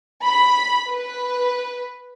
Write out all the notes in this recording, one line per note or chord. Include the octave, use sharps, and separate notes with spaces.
B5
B4